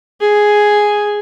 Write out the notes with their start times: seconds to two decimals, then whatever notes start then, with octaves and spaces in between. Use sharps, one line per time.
0.21 G#4